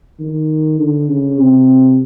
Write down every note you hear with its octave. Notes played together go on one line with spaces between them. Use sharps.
D#3
D3
C#3
C3